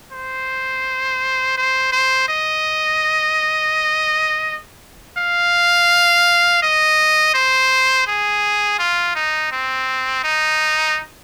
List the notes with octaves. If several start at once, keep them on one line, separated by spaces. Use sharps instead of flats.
C5
C5
C5
D#5
F5
D#5
C5
G#4
F4
D#4
C4
D#4